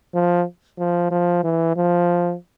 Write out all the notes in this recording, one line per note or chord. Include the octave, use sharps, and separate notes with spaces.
F3
F3
F3
E3
F3